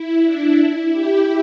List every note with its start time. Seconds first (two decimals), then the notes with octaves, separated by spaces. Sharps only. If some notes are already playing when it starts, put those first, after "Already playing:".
Already playing: E4
0.24 D4
0.58 E4
0.93 G4